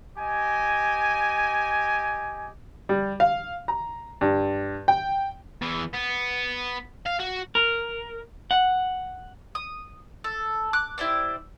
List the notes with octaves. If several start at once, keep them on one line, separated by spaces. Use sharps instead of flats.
G4 D#5 G#5
G3
F5
A#5
G2
G5
E2 E3
B3
F5
F#4
A#4
F#5
D#6
A4
D6 F#6
E4 G4 C5 D5